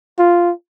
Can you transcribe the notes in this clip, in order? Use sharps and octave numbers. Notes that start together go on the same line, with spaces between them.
F4